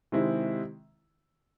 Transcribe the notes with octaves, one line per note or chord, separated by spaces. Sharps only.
C3 D#3 G#3 C4 E4